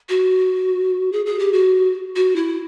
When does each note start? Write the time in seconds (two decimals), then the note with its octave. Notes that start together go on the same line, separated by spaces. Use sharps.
0.09 F#4
1.12 G#4
1.26 G#4
1.39 G4
1.53 F#4
2.16 F#4
2.36 E4